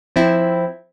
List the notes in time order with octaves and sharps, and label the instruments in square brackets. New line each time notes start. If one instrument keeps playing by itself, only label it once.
[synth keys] F3 C4 E4